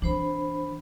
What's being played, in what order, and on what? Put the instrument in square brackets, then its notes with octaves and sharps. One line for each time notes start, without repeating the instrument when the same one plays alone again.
[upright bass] E3 C4 [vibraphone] D4 C5 B5